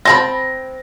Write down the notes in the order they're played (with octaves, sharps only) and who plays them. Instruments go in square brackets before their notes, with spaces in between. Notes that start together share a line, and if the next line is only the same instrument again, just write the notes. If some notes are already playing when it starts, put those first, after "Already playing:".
[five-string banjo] C4 A5 B5 [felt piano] A#6